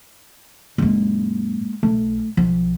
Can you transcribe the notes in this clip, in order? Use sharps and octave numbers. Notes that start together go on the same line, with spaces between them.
F#2 A#2 G#3 A#3
B1 A3
B1 F3